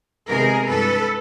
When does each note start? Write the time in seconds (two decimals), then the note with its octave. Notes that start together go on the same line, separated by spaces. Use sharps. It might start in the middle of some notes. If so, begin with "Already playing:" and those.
0.29 C3 D#3 G#3 B3 G#4 A#4
0.67 G2 E3 G#3 A4 B4